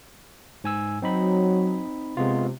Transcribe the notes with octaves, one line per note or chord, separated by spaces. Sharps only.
G#2 G#5 E6
F#3 C4 D#4 B5
C3 G#3 B3 F4